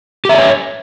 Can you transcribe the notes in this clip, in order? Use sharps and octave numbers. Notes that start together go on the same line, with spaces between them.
G4 C#5 D5 E5